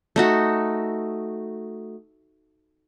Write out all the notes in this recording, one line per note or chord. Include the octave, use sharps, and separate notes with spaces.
A3 D#4 F#4